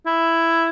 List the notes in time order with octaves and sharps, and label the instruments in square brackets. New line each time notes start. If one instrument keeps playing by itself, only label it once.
[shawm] E4